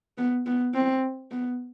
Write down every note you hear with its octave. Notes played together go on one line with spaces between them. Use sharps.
B3
B3
C4
B3